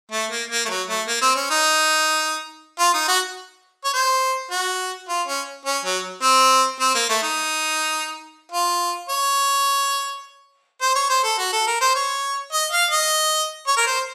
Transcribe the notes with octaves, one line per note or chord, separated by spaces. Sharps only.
A3
A#3
A#3
A3
F#3
A3
A#3
C4
C#4
D#4
F4
D#4
F#4
C#5
C5
F#4
F4
C#4
C#4
F#3
C4
C4
A#3
A3
D#4
F4
C#5
C5
C#5
C5
A4
F#4
A4
A#4
C5
C#5
D#5
F5
D#5
C#5
A#4
C5